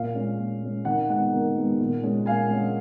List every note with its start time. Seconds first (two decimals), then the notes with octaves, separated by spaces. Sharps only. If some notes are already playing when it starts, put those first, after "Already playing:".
Already playing: A#2 F5
0.14 G#3 C#4
0.38 A#2
0.61 G#3 C#4
0.85 D#3 F#5
1.10 G#3 B3 F#5
1.33 D#3
1.56 G#3 B3
1.80 A#2
2.03 G#3 C#4
2.26 A#2 F5 G#5
2.50 G#3 C#4